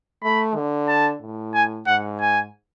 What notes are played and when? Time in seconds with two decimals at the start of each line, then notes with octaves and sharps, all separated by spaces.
0.23 A3 B5
0.56 D3
0.88 A5
1.22 A2
1.54 G#5
1.86 G#2 F#5
2.20 G#5